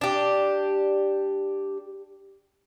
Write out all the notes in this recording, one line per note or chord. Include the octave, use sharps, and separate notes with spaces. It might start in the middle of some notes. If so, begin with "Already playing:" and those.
D4 G4